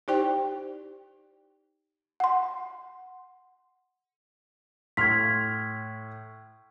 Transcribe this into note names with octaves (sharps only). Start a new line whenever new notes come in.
D#4 E4 G4 C5 D5 G5
F#5 C6
A2 C6 F6 G#6 B6